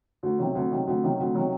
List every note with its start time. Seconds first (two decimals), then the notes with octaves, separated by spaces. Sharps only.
0.23 D2
0.39 C3 D#3 F#3
0.55 D2
0.71 C3 D#3 F#3
0.87 D2
1.03 C3 D#3 F#3
1.20 D2
1.35 C3 D#3 F#3